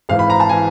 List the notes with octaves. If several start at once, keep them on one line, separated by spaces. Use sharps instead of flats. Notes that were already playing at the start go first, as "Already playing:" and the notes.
G#1 G#2 E3 F5
B5
A#5
A5
E3 G#5